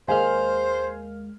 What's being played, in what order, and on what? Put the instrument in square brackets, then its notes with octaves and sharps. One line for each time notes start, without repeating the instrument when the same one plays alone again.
[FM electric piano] D#2 G#3 F6 [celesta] A#4 F5 [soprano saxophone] C5 [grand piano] G#5